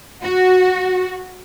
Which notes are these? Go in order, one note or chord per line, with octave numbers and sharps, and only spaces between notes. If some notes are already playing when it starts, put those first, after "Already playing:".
F#4